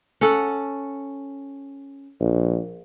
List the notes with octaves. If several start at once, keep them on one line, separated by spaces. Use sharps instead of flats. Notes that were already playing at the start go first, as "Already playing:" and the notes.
C#4 A4 F#5
A#1